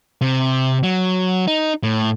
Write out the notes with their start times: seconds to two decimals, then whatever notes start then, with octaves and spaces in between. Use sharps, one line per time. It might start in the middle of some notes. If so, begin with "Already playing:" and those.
0.21 C3
0.83 F#3
1.47 D#4
1.83 A2